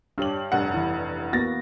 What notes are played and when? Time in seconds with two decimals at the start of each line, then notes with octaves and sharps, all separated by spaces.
0.18 G2 D4 G4 C#5 F#7
0.52 F1 G2 F#5
0.74 E3 E4
1.33 A#3 B3 F#4 A6 A#6